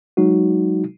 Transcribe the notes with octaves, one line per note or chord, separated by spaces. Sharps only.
F#3 G#3 D#4 F#4